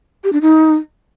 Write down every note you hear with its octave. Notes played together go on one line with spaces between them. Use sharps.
G4
D4
D#4